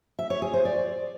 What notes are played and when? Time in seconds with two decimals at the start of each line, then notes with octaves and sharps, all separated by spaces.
0.19 E5
0.30 C#5
0.42 G#4
0.54 C5
0.65 D5